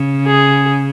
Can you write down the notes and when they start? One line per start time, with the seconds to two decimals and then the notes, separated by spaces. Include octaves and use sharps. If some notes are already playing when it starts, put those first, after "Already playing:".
Already playing: C#3
0.26 G#4